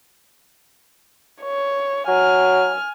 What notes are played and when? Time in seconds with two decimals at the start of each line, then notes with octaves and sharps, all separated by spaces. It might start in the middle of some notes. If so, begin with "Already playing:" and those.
1.42 C#5
2.08 F#3 G#5 F6